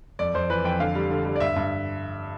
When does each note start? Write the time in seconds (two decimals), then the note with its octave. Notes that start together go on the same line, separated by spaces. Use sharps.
0.19 F2 D5
0.35 F2 C5
0.50 E3 B4
0.64 F2 G5
0.80 D3 F5
0.95 G3
1.11 D3
1.25 G3
1.36 D5
1.40 G2 E5
1.56 G2